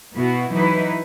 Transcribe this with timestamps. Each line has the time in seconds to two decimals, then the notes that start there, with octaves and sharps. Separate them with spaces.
0.15 B2 B3 E4 F#4
0.51 E3 F#3 D#4 E4 B4